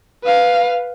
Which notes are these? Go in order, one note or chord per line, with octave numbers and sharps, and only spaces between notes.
B4 F5